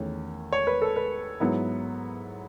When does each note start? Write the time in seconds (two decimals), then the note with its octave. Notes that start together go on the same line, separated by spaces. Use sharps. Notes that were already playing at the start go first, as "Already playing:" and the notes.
Already playing: E2 D#3 A3 C#4
0.52 C#5
0.67 B4
0.82 A4
0.96 B4
1.40 G#2 F#3 B3 E4